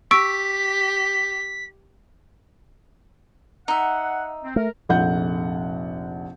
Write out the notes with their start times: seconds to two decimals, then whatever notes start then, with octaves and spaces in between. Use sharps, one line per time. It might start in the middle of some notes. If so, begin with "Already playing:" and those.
0.11 G4 C#6 E6 B6 D7
3.68 D#4 E5 F#5
4.43 C4
4.56 A3 A#4
4.89 F1 A#1 F#5 G6